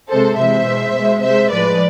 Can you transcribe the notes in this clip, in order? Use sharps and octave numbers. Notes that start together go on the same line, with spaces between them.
C3 G#3 A4 C5
C3 E3 G#3 C5 E5
B2 G#3
B2 G#3
C3 G#3 C5 E5
A2 F3 G#3 B4 D5